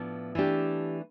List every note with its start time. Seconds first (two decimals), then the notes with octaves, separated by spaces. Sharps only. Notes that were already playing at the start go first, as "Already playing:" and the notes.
Already playing: A2 F3 B3 D4
0.35 E3 A3 D4 G4